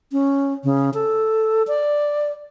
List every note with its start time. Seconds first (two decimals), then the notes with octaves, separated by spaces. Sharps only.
0.12 C#4
0.64 C#3
0.94 A4
1.67 D5